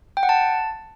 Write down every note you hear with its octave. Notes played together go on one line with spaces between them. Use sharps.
G5
F#5
A5